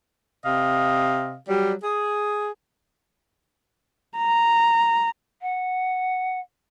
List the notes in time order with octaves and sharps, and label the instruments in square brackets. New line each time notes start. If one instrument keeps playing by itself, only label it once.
[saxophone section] C3 D#5 F5
F#3 G3
G#4
[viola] A#5
[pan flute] F#5